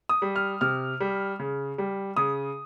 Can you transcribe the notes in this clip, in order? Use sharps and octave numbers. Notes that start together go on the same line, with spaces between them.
D#6
G3
F6
C3 F6
G3
C#3
G3
C#3 D#6